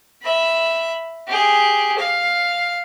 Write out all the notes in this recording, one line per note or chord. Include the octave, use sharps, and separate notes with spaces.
E5 B5
G4 G#4
F5